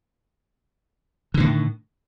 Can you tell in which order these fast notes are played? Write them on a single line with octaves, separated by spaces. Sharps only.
D3 D#3 A2